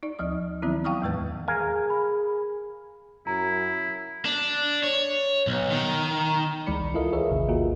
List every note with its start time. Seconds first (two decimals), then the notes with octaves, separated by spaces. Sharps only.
0.03 D#4 D5
0.19 D2 F3 D#6
0.62 D#3 F#3 B3 C4 E4
0.84 F5 G5 A5 C#6 D#6 F6
1.02 E2 A2 E3 G#3 B4 G6
1.48 G#4 A#4 F5 G#5
1.90 B5
3.27 F#2 E4 A#5
4.25 D4
4.83 C#5
5.47 B1
5.71 D#3
6.66 D2 E3 G#3 D5 B5 C#7
6.81 C2
6.94 E4 F4 A4 A#4 D#5 F5
7.13 G#4 A#4 B4 C#5 D#5 E5
7.31 A1 D#2 C3 D#3
7.48 A#3 F4 F#4 G#4 A#4